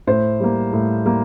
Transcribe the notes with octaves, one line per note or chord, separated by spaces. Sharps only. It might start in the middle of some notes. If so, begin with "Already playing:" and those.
A2 C5
G3 A#3
A2
G3 A#3